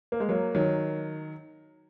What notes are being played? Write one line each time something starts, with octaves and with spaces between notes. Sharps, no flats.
A#3
G#3
F#3 A#3
D#3 F#3